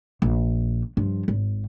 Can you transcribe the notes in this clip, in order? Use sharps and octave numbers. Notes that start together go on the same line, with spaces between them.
A#1
G2 F3
G#1